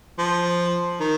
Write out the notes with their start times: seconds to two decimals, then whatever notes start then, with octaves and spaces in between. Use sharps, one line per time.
0.18 F3
1.00 D#3